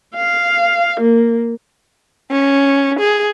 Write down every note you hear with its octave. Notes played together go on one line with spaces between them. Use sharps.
F5
A#3
C#4
G#4